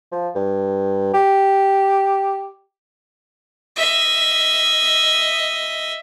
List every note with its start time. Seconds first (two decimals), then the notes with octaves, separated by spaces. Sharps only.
0.12 F3
0.35 G2
1.14 G4
3.76 D#5 E5